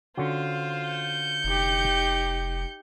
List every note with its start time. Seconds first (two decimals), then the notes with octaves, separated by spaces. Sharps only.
0.17 D3 C#4 F4 F#4 C5
0.89 G6 C#7
1.44 F1 D#4 G4